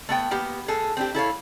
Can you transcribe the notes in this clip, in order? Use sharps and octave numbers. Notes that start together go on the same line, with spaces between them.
A3 B3 G5
A#3 B3 G4
A2 G#4 A4
C4 D4 G4
E4 A4 C#5 F5